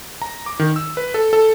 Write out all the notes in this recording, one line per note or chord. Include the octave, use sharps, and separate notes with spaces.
A#5
D6
D#3
E6
B4
A4
A4